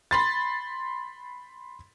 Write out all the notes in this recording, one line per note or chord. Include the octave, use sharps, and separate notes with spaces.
B5 C6 A6